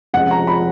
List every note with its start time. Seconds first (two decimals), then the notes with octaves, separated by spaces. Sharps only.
0.14 F1 F2 C#3 F3 G#3 F#5
0.31 A#5
0.47 B5